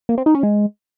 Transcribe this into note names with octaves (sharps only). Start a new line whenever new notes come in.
A#3
C4
D#4
C#4
G#3